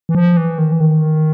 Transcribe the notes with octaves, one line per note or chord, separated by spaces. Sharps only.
E3
F3
E3
D#3
E3
D#3